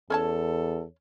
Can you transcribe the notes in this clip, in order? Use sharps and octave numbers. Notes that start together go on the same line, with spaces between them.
E2 C#4 A4 C#5 A5